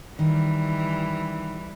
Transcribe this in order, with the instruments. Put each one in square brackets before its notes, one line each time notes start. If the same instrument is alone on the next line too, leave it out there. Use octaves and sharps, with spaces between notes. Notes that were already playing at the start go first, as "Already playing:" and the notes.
[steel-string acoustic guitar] D#3 [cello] E3 G3